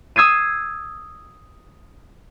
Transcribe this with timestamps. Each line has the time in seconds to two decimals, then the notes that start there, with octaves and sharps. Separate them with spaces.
0.16 D#6 E6 G#6 C7 D#7